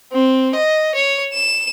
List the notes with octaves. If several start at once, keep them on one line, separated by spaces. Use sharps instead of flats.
C4
D#5
C#5
E7